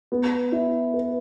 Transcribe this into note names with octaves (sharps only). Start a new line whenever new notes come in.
B3
E4
B4